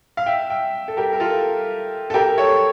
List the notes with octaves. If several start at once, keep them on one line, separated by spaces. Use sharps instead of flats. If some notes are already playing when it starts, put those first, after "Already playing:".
F5
E5 G5
E5 G5
A4
G4 A#4
A#4
F4 A4
A4
G4 A#4
A4 C#5